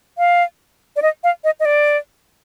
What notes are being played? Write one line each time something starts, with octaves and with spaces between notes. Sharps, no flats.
F5
D5
D#5
F5
D#5
D#5
D5